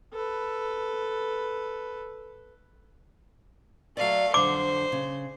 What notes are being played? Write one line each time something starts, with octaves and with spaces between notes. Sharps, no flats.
A4 B4
F#3 A3 D5 F5
F2 D3 C5 D6
C#3